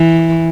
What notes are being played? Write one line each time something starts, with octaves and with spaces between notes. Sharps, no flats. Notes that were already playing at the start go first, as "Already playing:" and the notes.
Already playing: E3